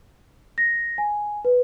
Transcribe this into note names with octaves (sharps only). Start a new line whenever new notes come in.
A#6
G#5
B4